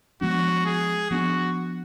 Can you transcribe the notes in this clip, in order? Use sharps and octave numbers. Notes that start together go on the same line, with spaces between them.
F3 G#3 B3 D4 F#4
G#4
F3 B3 D4 F#4